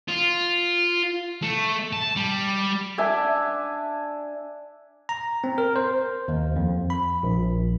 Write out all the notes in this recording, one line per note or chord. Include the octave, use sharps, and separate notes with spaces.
F4
A3
A5
G3
D4 E5 G#5 D6
A#5
C4
A#4
C5
D#2
F2
B5
A#1